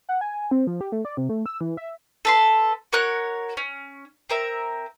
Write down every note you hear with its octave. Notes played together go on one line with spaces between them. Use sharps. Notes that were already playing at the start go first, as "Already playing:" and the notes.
F#5
G#5
C4
F3
G4
A3
D5
C3
A3
E6
E3
E5
A4 B4 C6
F#4 A#4 C#5 F#6
C#4
C4 A#4 E5